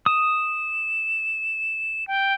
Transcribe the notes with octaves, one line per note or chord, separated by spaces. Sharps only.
D#6 E7
G5